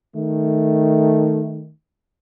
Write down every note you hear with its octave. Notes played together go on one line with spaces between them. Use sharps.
D#3 A3